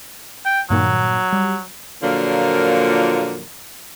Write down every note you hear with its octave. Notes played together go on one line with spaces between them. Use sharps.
G5
G2 A#2 D#3 F#3
G3
A#2 D3 F3 F#3 A#3 A#4